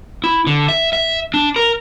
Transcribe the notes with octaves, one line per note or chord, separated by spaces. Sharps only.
E4
D3
E5
E5
D4
A#4